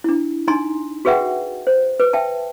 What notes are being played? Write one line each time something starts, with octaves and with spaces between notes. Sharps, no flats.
D4 E4
D4 D#4 G#5 A#5 C6
F#4 G#4 B4 E5 F#5 G5
C5
B4
E5 G5 A5